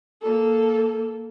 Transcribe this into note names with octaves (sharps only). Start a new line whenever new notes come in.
A#3 A4